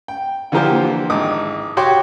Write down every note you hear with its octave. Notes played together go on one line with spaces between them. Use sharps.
G5
D3 E3 F3 A#3 G4 C5
G#1 D6 D#6
F#4 G4 C#5 G5 C6 D6